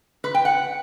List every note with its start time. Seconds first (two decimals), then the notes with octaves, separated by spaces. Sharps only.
0.24 B4
0.34 G5
0.45 F#5